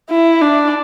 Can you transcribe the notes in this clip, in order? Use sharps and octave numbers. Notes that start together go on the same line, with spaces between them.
E4
D4